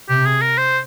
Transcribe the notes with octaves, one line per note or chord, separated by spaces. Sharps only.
C3 G4
G#4
A#4
C5